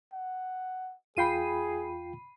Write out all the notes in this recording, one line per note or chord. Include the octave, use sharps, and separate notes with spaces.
F#5
E2 F4 G#4 G5 B5 C7 D#7